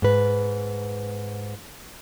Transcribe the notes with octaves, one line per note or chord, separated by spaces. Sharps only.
G#2 B4